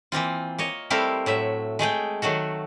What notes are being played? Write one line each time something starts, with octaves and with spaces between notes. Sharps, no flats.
E3 A#3 C4 F4
A#3 C#5 D#5
G3 A3 C4 E4 A#4 F5
A2 F#3 E5
G#3 A3 G#4 G5
D#3 F#3 A3 F#4